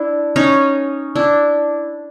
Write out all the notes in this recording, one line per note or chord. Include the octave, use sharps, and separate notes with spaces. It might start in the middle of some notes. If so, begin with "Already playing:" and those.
Already playing: D4 E4
C#4 D#4
D4 E4